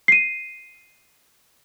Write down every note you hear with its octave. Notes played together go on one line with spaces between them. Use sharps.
C7 D#7